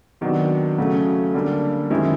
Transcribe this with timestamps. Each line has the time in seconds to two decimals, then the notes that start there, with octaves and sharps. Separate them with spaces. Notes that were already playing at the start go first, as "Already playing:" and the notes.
0.21 C3 D#3 F#3 B3 D4
0.78 C#3 F#3 A3
1.34 D3 G3 A#3 D4
1.90 F#2 D#3 G#3 C4 E4